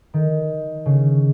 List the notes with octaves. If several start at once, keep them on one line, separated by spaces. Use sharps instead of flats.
D#3
C#3